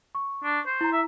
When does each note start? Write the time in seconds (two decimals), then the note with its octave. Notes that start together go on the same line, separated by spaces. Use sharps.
0.15 C#6
0.44 D4
0.66 C5
0.81 E4 A#5
0.92 E5